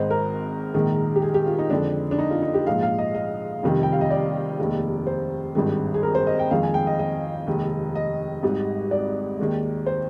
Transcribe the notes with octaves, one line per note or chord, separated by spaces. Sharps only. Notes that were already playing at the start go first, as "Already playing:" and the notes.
Already playing: G#1 G#2 D#3 G#3 C5 D#5
A#4
A#1 G#2 D#3 G#3
G4
G#4
G4
F4
D#4
F2 D3 G#3 D4
D4
D#4
F4
D#4
G4
A#1 G#2 F3 G#3 F5
F5
D#5
D#5
F1 F2 C3 D#3 G3
G5
F5
D#5
D5
F1 D#2 D#3 G#3
C5
G#1 G2 D#3 G#3
G#4
A#4
C5
D#5
G5
F2 D#3 G#3 F5
G#5
G5
D#5
D#5
F1 D#2 D#3 G#3
D#5
G#1 G#2 G3
D5
D#2 D#3 G#3
C5